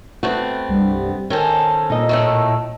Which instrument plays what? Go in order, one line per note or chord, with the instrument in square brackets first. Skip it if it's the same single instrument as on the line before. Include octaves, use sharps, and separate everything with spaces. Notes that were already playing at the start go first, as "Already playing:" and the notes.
[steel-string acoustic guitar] A3 B3 C4 [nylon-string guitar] F#4
[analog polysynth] C2 G2 G3
[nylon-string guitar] D#3 [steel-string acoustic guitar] C#4 A4 C5 [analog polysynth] G#5
[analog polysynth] A#2 E6 [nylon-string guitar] D#4 D#5
[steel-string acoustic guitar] A2 D#3 A3